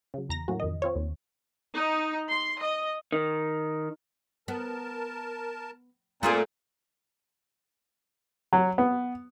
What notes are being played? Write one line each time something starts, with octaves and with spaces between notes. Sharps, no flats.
C#3 F#3
E2 A#5 A#6
A2 F#3 A#3 C#4 F#4
F2 D#3 D#5
C4 F4 C#5
D#2
D#4
C6
D#5
D#3
B3 A#4 A5
A#2 A3 C4 F4 G#4 D5
F#3
B3